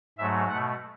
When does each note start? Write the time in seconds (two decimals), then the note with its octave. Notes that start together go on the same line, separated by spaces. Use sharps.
0.18 G#2 F#3 A3 E5
0.48 B2 A3 F#5